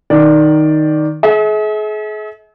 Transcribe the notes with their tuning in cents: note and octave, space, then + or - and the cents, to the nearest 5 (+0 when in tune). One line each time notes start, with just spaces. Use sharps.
D#3 +0 D5 +0
G#4 +40 E5 -40